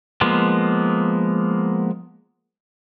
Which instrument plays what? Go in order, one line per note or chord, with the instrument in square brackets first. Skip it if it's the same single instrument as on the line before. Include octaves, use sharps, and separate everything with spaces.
[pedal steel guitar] F3 G#3 A#3 B3